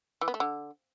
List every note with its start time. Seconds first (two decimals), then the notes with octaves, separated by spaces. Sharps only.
0.21 E3
0.28 B3
0.34 A3
0.40 D3